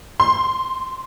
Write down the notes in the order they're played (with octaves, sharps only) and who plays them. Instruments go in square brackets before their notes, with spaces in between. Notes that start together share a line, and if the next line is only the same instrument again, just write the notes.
[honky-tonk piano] C6